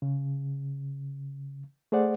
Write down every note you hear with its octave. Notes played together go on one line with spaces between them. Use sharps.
C#3
A3 G#4 C5 D5 F#5